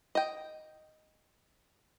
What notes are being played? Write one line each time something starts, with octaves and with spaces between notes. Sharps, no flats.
D#5 G5